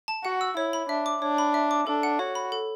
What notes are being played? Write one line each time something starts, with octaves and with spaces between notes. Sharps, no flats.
A5
F#4 F#5
E6
E4 C#5
B5
D4 E5
D6
D4 C#5
B5
E5
D6
D4 A4
F#5
F#4 C#5
B5
A4